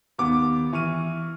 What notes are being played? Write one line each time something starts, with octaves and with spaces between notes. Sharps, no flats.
D#2 B3 D6
E3 C#6 F6 D#7